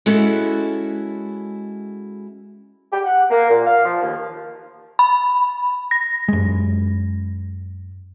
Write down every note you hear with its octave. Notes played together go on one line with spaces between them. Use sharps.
G#3 C#4 E4 F#4 A4 E5
G4
F#5
A#3
A#2
F5
F3
D#2
B5
A#6
F#2 G#3